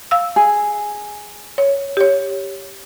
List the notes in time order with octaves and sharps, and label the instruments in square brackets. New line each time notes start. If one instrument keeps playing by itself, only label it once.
[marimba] F5 E6
[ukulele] G#4
[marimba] C#5
G4 C#5